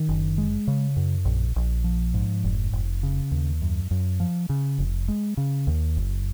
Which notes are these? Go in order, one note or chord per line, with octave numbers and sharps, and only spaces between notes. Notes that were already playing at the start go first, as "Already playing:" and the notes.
Already playing: D#3
F#1
G#3
C#3
F#2
A#1
A#1
F3
G#2
F1
F1
C#3
D#2
F#2
F#2
F3
C#3
F1
G#3
C#3
D#2
F#1